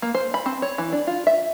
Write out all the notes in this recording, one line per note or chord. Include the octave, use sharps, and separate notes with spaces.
A#3
C5
B5
C4
C#5
E3
D4
F4
E5